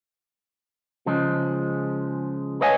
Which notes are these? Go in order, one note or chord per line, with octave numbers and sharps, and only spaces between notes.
C#3 F3 G#3
B4 C#5 D#5 F5 G#5